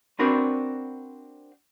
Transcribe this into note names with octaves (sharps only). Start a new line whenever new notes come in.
C4 D4 F#4 A#4 B4